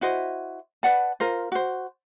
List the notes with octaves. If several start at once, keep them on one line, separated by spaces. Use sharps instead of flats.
E4 F#4 C5 D#5
B4 D5 F#5 A5
F4 A#4 C5
F#4 C5